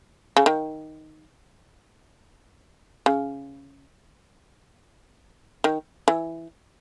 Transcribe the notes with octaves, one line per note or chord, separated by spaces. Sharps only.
C#3
D#3
C#3
D#3
E3